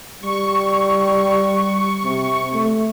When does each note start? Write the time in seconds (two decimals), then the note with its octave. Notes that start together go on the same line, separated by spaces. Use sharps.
0.23 G3 C#6
2.04 C3
2.53 A3